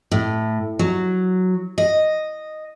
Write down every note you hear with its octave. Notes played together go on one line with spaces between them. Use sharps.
A2
F#3
D#5